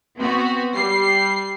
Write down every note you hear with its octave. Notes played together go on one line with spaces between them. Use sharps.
B3 C4 F#4
G3 C7